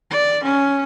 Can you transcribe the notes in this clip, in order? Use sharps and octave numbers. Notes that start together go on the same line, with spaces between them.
D5
C#4